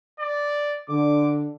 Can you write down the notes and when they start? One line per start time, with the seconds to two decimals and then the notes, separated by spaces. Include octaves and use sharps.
0.20 D5
0.89 D3 D6